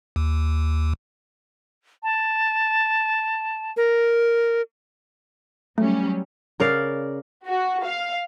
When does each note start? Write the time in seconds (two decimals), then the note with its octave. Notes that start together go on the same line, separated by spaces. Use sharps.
0.16 D#2
2.03 A5
3.77 A#4
5.78 F#3 G3 A3 C#4
6.60 C#3 A#4 D5 F5
7.46 F#4
7.84 F5